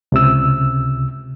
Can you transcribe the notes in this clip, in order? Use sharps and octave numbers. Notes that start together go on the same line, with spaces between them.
C#2 C3 E6